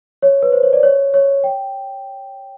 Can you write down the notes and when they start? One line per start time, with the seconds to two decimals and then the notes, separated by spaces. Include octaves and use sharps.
0.22 C#5
0.43 B4
0.52 C5
0.63 C#5
0.73 D5
0.83 C#5
1.14 C#5
1.44 G5